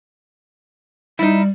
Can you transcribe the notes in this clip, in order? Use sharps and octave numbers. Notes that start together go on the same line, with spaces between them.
G3 D#4 E4